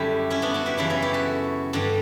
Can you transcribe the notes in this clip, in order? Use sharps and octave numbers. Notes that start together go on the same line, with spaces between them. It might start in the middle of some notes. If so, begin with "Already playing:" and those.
Already playing: F#2 D3 G3 E4 G4
C#4 E4
B3 D4
D4 F#4
E4 G4
F#2 C#3 E3 C#4 E4
C#4 E4
E4 G4
F#4 A4
G2 D3 G3